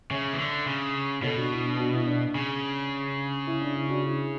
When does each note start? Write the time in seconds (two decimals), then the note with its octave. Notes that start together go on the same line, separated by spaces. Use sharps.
0.11 C#3 C#5 E5
0.34 E3
0.39 D3
0.67 C#3
1.22 B2 A4 C#5
1.37 D4 F#4
1.51 E4
1.65 D4
1.79 D4 F#4
1.93 E4
2.07 D4
2.21 D4
2.35 C#3
3.47 E4
3.61 D4
3.75 E4
3.89 D4 F#4
4.03 E4